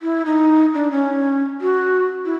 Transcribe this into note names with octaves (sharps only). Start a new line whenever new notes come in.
E4
D#4
D4
C#4
F#4
E4